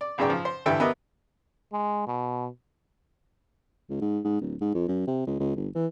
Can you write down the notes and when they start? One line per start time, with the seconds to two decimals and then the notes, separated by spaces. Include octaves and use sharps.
0.01 D5
0.18 B1 F#2 C#3 D5 G5
0.30 F3
0.45 C5
0.66 D2 G2 E3 A4 E5 G5
0.80 B3 G4 A#4 B4 D#5 E5
1.73 G#3
2.07 B2
3.89 C#2
4.01 G#2
4.25 G#2
4.41 D1
4.61 G#2
4.74 F2
4.88 F#2
5.07 C3
5.27 C#2
5.40 C#2
5.56 G1
5.75 E3